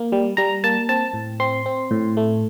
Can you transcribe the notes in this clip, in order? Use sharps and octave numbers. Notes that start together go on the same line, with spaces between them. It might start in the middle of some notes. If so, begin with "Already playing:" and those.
Already playing: A#3
G3
G3 A#5
A#3 A5
C4 A5
A2
C4 C6
C4
A2
A3